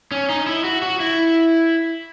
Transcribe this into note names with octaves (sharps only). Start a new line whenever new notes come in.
C#4
D#4
E4
F#4
F#4
E4